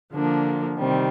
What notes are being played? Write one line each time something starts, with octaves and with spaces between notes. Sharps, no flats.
D3 F3 A#3 D4
C3 D#3 G3 C4